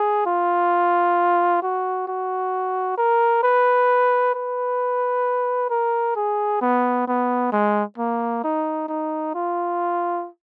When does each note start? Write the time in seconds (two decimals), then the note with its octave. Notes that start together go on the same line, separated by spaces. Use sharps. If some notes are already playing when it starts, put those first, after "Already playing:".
Already playing: G#4
0.26 F4
1.63 F#4
2.08 F#4
2.98 A#4
3.43 B4
4.34 B4
5.70 A#4
6.16 G#4
6.61 B3
7.08 B3
7.52 G#3
7.98 A#3
8.44 D#4
8.88 D#4
9.35 F4